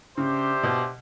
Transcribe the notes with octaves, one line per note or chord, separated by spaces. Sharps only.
C#3 D4 G4 C5 E5
B2